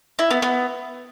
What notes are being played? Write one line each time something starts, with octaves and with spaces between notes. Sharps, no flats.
E4
B3
B3